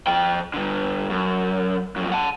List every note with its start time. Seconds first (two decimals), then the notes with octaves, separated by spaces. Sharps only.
0.07 F3 G5
0.54 G2 D3
1.10 F#2
1.96 F#2 F3
2.12 F#5 A5